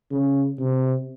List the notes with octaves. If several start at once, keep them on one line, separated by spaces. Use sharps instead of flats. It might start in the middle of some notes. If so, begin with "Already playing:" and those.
C#3
C3